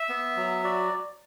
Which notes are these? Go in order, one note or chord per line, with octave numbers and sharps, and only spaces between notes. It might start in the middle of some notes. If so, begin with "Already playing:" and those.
Already playing: E5
B3
F#3
F#4 D5